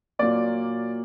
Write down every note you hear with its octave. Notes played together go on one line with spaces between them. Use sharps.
A#2 F#3 A#3 D5